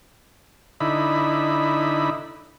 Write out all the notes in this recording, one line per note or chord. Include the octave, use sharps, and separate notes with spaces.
D3 D#4 E4 B5